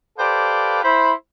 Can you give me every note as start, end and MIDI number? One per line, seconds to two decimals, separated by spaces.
0.18 0.81 67
0.18 0.81 69
0.18 0.81 71
0.18 0.81 72
0.18 0.81 74
0.18 0.81 77
0.83 1.13 64
0.83 1.13 72
0.83 1.13 83